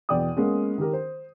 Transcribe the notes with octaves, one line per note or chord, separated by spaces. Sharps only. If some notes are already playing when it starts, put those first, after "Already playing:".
E2 B2 D5 G5 D#6
G#3 A#3 B3 C#4
D#3 G4 A#4
C5